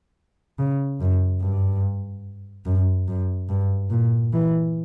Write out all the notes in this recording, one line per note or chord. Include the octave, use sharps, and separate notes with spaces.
C#3
F#2
G2
F#2
F#2
G2
A#2
E3